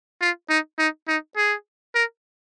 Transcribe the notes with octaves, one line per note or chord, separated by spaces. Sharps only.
F4
D#4
D#4
D#4
G#4
A#4